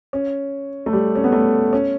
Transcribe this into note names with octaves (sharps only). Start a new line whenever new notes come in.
C#4
A3
G3
C#4
B3
A3
C#4